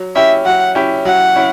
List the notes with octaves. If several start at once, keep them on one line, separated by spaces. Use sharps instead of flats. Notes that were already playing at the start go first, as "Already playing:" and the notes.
Already playing: F#3
C#4 E4 G4 E5
F#3 F#5
C#4 E4 G4
F#3 F#5
C#4 E4